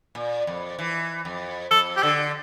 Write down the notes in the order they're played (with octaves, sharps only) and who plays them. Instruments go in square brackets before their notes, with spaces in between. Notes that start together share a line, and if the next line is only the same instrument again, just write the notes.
[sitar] A#2
F2
E3
F2
[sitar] F2 [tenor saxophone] A4
[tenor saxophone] G4
[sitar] D3 [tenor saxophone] A4